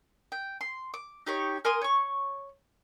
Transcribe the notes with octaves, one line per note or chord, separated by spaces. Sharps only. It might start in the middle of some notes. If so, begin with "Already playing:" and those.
G5
C6
D6
D#4 G4 C#5
A#4 G#5 C6 D#6
C#5 C#6